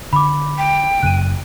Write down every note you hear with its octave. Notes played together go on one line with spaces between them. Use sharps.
D3 B5 D6
G5
F#1 F#2 C#3 F#6 D#7